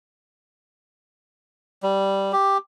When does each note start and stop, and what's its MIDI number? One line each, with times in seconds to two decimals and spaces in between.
1.83 2.32 55
2.33 2.58 67